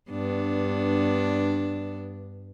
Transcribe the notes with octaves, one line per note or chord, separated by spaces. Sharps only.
G2 B3 D4